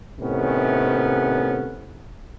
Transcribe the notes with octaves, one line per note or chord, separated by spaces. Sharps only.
A2 C3 D#3 B3 C#4